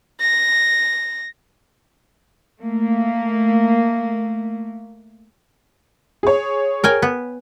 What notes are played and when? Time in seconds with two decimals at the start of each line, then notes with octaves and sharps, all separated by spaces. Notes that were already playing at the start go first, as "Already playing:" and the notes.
0.20 A#6
2.60 A3 A#3
6.23 G#4 C#5
6.84 A#4 G5 G#5
7.02 B3